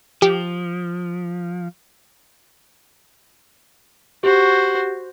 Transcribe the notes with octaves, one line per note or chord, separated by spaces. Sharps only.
F3 G4
F#4 G4 C5